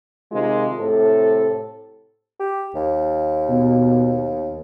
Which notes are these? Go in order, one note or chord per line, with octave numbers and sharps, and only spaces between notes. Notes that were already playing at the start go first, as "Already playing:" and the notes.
C3 D#3 G#3 F4
A2 C3 A4
G4
D#2
B2